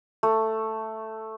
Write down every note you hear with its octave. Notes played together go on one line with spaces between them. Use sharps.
A3